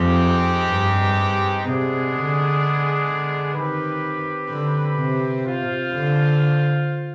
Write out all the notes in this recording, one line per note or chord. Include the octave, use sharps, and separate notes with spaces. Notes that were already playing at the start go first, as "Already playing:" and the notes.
Already playing: F2 G#3 C4 D#4 G4
G2
C3 G#3 B3 D4 G#4
D3
D3
D#3 C4 G4 B4
D3
C3
F4 C5 F5
D3